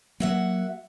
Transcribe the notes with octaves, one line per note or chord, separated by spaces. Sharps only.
F#3 A#3 F#4 E5 F#5